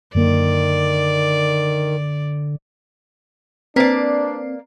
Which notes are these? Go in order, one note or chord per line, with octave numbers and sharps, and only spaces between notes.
F#2 D3 D#3 A#3 D5
A#3 C4 D4 B4 D5 B6